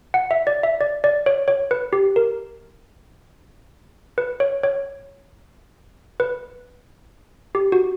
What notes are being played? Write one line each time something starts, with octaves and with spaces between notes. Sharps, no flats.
F#5
E5
D5
E5
D5
D5
C#5
C#5
B4
G4
A#4
B4
C#5
C#5
B4
G4
F#4